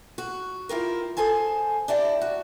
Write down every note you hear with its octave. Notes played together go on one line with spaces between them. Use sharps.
F#4
E4 F4 G4 A#4
G#4 A4 C5 G#5 A5
D4 E4 G4 D5
F#4